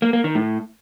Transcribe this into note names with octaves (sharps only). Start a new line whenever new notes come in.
A#3
A#3
D#3
A2